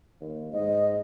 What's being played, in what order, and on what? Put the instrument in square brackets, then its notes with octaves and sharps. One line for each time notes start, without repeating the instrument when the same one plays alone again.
[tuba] D#2
[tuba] G#2 [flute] D#5